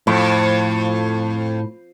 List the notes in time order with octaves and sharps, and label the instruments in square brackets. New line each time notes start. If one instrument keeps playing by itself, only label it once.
[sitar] F2 [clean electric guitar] A2